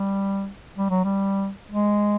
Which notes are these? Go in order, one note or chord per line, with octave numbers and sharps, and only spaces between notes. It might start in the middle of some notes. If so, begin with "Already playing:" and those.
Already playing: G3
G3
F#3
G3
G#3